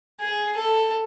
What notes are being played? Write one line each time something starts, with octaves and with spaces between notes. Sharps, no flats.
G#4
A4